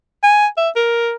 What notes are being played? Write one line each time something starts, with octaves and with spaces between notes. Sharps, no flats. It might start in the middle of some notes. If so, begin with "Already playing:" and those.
G#5
E5
A#4